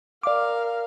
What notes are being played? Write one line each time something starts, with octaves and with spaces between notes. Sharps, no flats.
A#4 D5 F5 D6